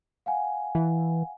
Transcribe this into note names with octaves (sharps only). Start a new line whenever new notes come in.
F5 F#5 G#5
E3